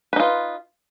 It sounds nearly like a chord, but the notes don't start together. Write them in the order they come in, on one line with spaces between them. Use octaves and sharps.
B4 D#4 F4